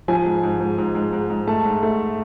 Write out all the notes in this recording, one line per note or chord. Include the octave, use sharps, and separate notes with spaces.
F3 G#5
G#2
G#2
G#2
G#2
G#2
G#2
G#2
A3 A5
G#2
A3